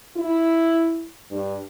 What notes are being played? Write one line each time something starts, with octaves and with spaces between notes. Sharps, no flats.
E4
G2